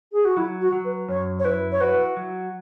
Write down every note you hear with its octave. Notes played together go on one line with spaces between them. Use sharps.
G#4
F#4
F#3 E4
F#4
F#3
B4
F#2 C#5
C#5
E4 B4
C#5
F#4 B4
F#3